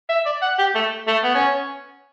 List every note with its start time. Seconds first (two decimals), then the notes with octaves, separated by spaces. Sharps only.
0.09 E5
0.26 D5
0.42 F#5
0.58 G4
0.75 A3
1.07 A3
1.23 B3
1.35 C#4